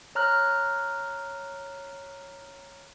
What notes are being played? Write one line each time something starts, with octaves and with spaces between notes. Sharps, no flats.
C#5 A#5 F6 F#6